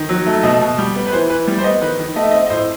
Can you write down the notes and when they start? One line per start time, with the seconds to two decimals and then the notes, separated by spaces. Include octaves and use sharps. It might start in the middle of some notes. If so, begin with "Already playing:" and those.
Already playing: D#3
0.09 F#3
0.26 A3
0.43 B2 D#5
0.61 B2
0.78 G3
0.96 B3
1.07 B4
1.12 E3 C5
1.29 E3 B4
1.47 G3
1.58 C5
1.64 B3 D#5
1.81 D#3 B4
1.99 D#3
2.16 A3 D#5
2.23 E5
2.31 C4 D#5
2.46 D#5
2.50 A2 C5